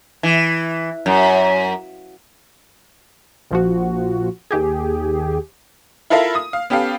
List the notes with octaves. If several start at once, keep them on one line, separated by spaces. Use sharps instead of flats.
E3
F#2
A#1 F3 F#4
D#2 G4 G#4
E4 F4 A4 A#4 E5 F5
D#6
F5
B3 C#4 G4 A4 F5